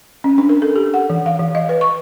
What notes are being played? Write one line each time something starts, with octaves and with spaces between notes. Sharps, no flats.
C#4
D4
A#4
A4
G4
F#5
E3
F5
E3
D#5
B4
C#6